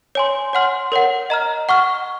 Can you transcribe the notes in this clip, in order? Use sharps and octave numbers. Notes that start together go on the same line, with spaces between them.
C#5 G#5 C6
C#5 F#5 C6 F6
A#4 C#5 F#5
D#5 A#5 F6
F#5 C#6 F6